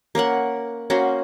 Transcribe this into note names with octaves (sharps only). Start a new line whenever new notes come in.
A#3 C#4 A#4 F#5
A#3 C#4 F#4 C5